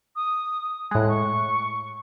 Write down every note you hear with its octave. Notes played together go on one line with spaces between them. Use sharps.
D#6
A2 G#3 F#6
C#6